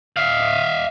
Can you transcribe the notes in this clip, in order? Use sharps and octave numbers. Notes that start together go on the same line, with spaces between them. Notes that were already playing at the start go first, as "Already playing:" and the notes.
E5 F5